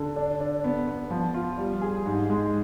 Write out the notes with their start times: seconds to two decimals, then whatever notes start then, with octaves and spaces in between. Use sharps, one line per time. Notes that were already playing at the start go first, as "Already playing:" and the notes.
Already playing: D3
0.16 D4
0.41 D4
0.64 B3
0.87 B3
1.10 F3
1.34 F4
1.58 G3
1.81 G#4
2.06 G#2
2.30 G#3